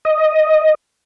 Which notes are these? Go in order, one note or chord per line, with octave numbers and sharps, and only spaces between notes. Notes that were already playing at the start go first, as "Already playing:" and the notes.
D#5